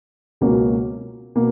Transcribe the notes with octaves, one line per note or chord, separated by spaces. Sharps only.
C#2 B2 F#3 A#3 C#4
B2 A#3